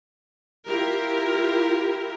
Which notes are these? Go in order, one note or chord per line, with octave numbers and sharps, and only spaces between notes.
E4 F4 G4 A#4